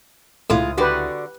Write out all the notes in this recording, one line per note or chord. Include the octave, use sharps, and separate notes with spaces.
C#2 A2 G#3 E4 F4 D#6
D3 F#4 G4 B4 D5